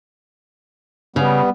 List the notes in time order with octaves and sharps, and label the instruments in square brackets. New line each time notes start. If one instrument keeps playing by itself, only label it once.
[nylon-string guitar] C#3 [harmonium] G3 B3